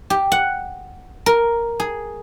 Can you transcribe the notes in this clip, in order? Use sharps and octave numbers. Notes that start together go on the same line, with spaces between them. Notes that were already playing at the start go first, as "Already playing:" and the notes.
G4
F#5
A#4
G#4